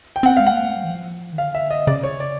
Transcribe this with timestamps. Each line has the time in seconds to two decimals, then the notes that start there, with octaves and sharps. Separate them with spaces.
0.16 G5
0.23 C4 F#5
0.37 G#3 F5
0.47 F#5
0.52 A#3
0.64 A3
0.77 G3
0.84 E3
0.90 F3
1.33 D#3
1.38 D3 F5
1.55 E5
1.71 D#5
1.87 C#3 D5
2.03 C#5
2.20 D5